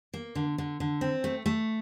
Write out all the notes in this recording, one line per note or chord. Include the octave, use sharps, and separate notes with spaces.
A#3
D3
D3
D3
C4
A3
A3